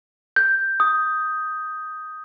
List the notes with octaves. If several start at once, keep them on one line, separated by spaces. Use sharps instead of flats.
G6
D#6